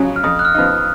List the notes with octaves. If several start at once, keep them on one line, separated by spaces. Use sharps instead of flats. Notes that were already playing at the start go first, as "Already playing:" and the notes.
Already playing: F2 C#3 F#3 C#4
F6
F2 D#6
F#6
F6
F3 B3 D#4